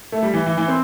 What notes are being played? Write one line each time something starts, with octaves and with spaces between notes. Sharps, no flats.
A3
G3
E3
E3
E3
C4